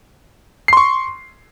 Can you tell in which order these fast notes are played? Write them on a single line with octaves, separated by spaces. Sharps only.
C7 C6 C#6